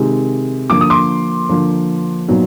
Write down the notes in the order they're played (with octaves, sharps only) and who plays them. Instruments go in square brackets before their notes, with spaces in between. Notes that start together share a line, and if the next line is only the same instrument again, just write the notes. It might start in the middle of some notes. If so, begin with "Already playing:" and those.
Already playing: [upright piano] C3 D#3 G#3
D3 F3 A#3 D6
D#6
C6 D6
D3 F3 A#3
A#2 F#3 B3 D#4